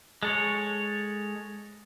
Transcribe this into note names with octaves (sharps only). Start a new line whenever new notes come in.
G#3 A4 C#5